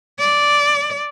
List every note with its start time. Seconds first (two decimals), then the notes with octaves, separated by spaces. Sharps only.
0.19 D5